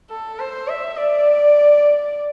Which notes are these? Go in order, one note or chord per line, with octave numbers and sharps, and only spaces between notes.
A4
C5
E5
D5